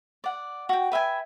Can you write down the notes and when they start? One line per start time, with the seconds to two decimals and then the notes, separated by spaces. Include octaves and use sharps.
0.24 D5 F#5
0.69 F#4 G5
0.92 B4 E5 G5 G#5